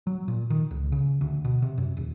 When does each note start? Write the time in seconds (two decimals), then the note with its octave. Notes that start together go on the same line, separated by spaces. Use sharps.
0.07 F#3
0.28 A#2
0.50 D#3
0.71 C#2
0.92 C#3
1.21 D2
1.44 B2
1.62 C3
1.78 F#2
1.97 D#1